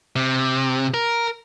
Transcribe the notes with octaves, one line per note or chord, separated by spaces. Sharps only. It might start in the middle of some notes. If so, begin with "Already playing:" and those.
C3
A#4